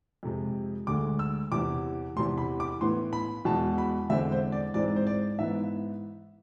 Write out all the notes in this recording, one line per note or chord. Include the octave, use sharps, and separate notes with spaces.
F2 C3 G#3
D2 D3 G#3 D6
E6
E2 C3 E3 D6
E2 C3 E3 C6
B5
D6
A2 E3 B3 C6
B5
E2 B2 G#3 A5
B5
E2 D3 G#3 C4 E5
C5
D5
G#2 E3 G#3 C4 D5
C5
D5
G#2 E3 B3 E5